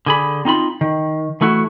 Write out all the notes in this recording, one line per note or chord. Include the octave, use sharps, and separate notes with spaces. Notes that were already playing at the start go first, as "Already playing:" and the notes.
D3 G#4 B5
C4 D#4 F4 B5
D#3
E3 A3 E4 F#4